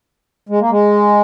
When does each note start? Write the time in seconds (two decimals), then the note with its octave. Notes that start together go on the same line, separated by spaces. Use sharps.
0.49 G#3
0.60 A#3
0.70 G#3